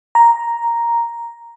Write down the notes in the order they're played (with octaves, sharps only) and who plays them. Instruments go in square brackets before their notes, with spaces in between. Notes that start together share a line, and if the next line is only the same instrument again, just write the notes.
[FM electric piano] A#5